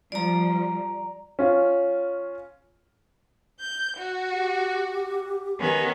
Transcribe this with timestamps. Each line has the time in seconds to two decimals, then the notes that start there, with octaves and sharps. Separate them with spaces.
0.12 F3 G3 D5 A#5
1.39 C#4 F4
3.59 G6
3.96 F#4
4.31 G4
5.60 D#3 B3 C#4